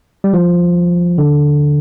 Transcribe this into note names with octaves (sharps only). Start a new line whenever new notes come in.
G3
F3
D3